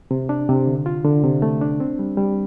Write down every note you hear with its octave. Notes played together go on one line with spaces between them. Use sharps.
C3
D4
C3
D3
F4
D3
C3
A3
D4
C4
G3
G3